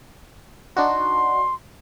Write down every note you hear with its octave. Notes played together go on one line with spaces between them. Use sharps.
D4 D#4 F#4 C6